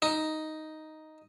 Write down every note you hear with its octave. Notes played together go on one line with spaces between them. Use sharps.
D#4